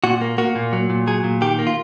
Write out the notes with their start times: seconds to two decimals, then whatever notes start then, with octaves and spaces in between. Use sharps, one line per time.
0.04 A#2 F#4
0.21 A#3
0.38 A#3 F#4
0.55 A#2
0.73 F#3
0.90 A#2
1.07 F#3 G#4
1.24 A#2
1.41 D#3 G4
1.59 A#3
1.67 F4